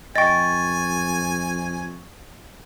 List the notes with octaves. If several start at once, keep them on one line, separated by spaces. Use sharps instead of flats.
F2 D#5 G5 G#5 C#6 A6